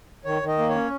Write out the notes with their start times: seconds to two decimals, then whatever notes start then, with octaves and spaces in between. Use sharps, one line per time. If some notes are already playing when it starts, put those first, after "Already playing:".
0.25 D#3 C#5
0.42 D#3
0.48 D#5
0.58 A#3
0.69 C#5
0.75 C#4